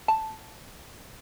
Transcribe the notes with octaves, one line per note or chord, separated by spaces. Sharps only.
A5